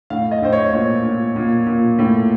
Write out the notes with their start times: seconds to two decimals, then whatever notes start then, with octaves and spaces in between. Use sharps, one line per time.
0.10 A2 F5
0.31 D#5
0.42 A2 C5
0.53 C#5
0.73 A#2 C#5
1.04 A#2
1.36 A#2
1.67 A#2
1.99 A2